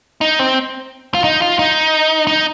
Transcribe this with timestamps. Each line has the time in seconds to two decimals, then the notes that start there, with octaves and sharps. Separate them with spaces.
0.21 D#4
0.39 C4
1.14 F4
1.24 D#4
1.42 F4
1.59 D#4
2.27 D#4